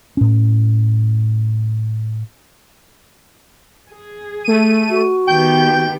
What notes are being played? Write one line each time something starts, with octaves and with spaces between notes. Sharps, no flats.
A2 C#4
G#4
A3 D#7
F#4
D#3 B3 G4 G5 G6